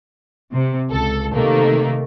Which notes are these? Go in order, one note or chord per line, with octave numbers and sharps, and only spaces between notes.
C3
C#2 A4
C3 D#3 A3 A#3